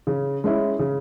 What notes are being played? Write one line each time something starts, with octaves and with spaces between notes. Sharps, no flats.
C#3
G#3 C#4 E4
C#3